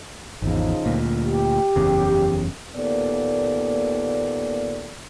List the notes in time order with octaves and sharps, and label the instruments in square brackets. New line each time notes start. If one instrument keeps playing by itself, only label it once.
[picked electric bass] G#1 E2 [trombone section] C#3 F3 D#4
[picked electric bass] D2 A#2
[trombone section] G4
[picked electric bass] F#1 E2 C#3
[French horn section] D#2 A#2 B3 A4 D5